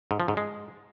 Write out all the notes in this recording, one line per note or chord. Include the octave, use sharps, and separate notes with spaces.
G#2
F3
G#2
G#3